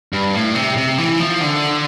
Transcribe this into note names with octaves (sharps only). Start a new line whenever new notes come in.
G2
A2
C3
C3
E3
F3
D3